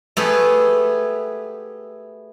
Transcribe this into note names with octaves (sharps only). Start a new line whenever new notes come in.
A3 B3 G4 G#4